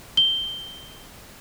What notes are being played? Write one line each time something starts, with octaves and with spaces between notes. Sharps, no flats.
G7